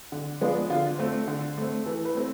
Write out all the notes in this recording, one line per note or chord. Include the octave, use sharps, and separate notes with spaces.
D3
F3 G#3 B3 D4
D3 F4
A3 C4
D3
A3 C4
E3 A4
B4
A3 C4